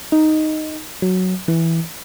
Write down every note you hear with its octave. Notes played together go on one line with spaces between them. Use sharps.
D#4
F#3
E3